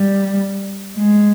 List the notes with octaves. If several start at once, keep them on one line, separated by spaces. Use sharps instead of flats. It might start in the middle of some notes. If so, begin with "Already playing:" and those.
Already playing: G3
G#3